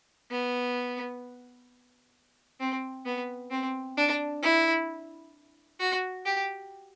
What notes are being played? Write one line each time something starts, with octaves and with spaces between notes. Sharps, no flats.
B3
C4
B3
C4
D4
E4
F#4
G4